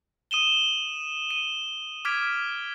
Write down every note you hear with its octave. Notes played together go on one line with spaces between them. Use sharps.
D#6 D#7 E7 G7
D#7
D6 F6 G#6 B6 D7